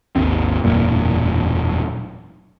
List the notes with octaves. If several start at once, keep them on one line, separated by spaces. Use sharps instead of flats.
G#1 D#2 C4
E1 F#2 A#2